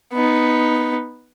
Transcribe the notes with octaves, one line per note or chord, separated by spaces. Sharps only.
B3 D#4